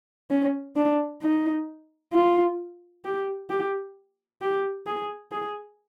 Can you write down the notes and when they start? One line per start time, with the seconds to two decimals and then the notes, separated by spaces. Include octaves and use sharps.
0.30 C#4
0.76 D4
1.21 D#4
2.13 F4
3.05 G4
3.50 G4
4.41 G4
4.87 G#4
5.32 G#4